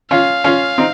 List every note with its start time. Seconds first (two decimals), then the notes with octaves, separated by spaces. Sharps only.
0.11 C#4 F4 F5
0.44 C#4 F4
0.78 C4 D#4